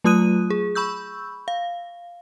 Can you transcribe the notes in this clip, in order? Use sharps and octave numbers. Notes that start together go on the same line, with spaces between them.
F#3 A3 F4 D#6 F#6 D#7
G#4
B5 C#6 E6 G6
F5